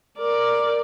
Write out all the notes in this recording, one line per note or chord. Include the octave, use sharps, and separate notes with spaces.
A#4 D5